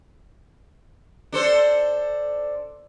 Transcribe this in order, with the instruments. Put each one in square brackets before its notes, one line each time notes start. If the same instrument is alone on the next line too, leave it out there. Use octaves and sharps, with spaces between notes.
[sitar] D4 A4 C5